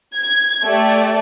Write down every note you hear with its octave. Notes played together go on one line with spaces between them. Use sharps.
G#6
A3 G4 D5